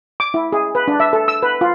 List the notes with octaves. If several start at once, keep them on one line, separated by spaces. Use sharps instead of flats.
D6
E4
G#4
B4
D4
E5
A4
E6
B4
F4